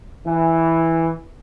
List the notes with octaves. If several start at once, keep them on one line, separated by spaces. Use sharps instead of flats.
E3